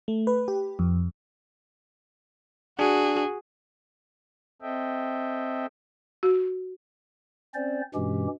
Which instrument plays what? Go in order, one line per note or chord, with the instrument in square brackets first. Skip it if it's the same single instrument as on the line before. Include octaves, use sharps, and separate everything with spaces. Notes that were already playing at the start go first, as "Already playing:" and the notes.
[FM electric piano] A3
B4
G4
F2
[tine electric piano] D4 [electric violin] F#4 G#4
[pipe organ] C4 A4 D#5 E5 G5
[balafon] F#4
[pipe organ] C4 C#4 C5 D5
G2 B2 E3 G#3 C#4 G4